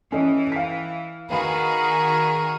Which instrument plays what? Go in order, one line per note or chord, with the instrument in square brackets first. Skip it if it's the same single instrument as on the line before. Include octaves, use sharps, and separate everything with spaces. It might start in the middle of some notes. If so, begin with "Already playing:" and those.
[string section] E3 [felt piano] C#4 A4 D#5
[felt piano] F5 B6
[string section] D#3 F#4 G#4 [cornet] A#4 [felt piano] B4 F5 B5